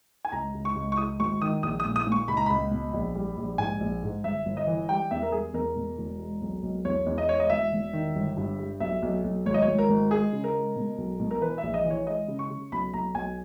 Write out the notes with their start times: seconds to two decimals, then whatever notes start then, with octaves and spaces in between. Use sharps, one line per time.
0.25 G#5
0.32 C#2 A#5
0.54 C#2
0.65 C#6
0.76 C#2
0.92 C#6
0.97 G#3 D#6
1.20 G#1 C#6
1.41 D#3 D#6
1.63 A#1 D#6
1.80 D#6
1.85 A#2
1.96 D#6
2.07 A#2
2.12 C#6
2.28 C#2 B5
2.37 A#5
2.46 C#2 B5
2.71 B2
2.93 A#1
3.15 G3
3.37 A#1
3.58 G#2 G#5
3.80 A#1
4.03 G#2
4.24 G1 E5
4.46 G1
4.57 D#5
4.67 E3
4.89 G3 G5
5.11 E2 E5
5.22 A#4
5.32 G3 G#4
5.54 E2 A#4
5.76 B2
5.98 E1
6.19 G#3
6.41 B1
6.63 B1
6.85 E2 C#5
7.07 E2
7.18 D#5
7.28 G#3 C#5
7.40 D#5
7.50 E1 E5
7.72 E1
7.93 D#3
8.16 G1
8.37 G2
8.59 G3
8.80 B1 E5
9.02 B1
9.24 B1
9.46 G#1 C#5
9.54 D#5
9.62 C#5
9.68 G#1
9.78 A#4
9.89 G#1
10.11 G#3 G#4
10.33 C#3
10.44 A#4
10.54 G#3
10.76 B2
10.98 B1
11.20 B2
11.31 A#4
11.41 E3 B4
11.58 E5
11.63 A#1
11.74 D#5
11.85 E3
11.90 C#5
12.07 G#3 D#5
12.28 C#3
12.39 C#6
12.50 C#3
12.72 B1 B5
12.94 B1 A#5
13.15 B1 G#5